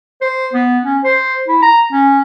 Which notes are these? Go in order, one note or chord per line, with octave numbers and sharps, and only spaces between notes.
C5
B3
C#4
C5
E4
A#5
C#4